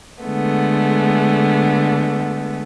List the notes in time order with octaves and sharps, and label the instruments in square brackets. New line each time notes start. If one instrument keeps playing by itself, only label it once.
[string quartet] D3 G#3 A3 B3